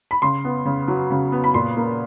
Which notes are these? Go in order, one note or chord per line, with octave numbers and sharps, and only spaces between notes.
B5
C#3 C6
B3
C#3
F#3
C#3
B3
B5
A#2 C6
A#3